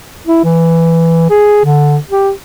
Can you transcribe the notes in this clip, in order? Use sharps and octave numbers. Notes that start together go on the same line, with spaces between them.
E4
E3
G#4
D3
G4